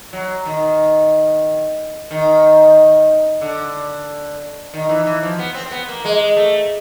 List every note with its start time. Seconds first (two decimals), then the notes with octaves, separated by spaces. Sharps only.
0.13 F#3
0.46 D#3
2.11 D#3
3.41 D3
4.74 D#3
4.89 E3
5.06 E3
5.23 F3
5.39 B3
5.54 C4
5.66 C4
5.71 B3
5.88 A#3
6.05 G#3
6.37 A3